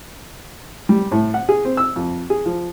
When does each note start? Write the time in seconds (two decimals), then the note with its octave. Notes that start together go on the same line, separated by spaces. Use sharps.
0.89 G3
1.12 A2
1.34 F#5
1.49 G#4
1.65 C4
1.77 E6
1.96 F2
2.30 G#4
2.46 F3